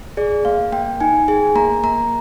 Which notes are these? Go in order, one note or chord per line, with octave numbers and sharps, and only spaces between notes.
G#4 D5
A#3 F5
A#3 G5
D#4 G#5
G#4 G#5
A#3 A#5
A#3 A#5